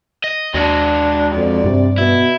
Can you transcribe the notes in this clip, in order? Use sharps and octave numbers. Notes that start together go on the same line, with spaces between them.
D#5
D#2 G#3 D4 F#4
F2 D5
G2 C3
B2 E4